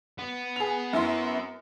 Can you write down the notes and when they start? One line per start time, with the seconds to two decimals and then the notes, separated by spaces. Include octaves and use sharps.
0.18 B3
0.56 G#4 F7
0.93 F#2 E4 C6